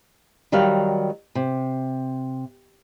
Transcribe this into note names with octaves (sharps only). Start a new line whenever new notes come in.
D#3 F#3 G3 A#4 F5
C3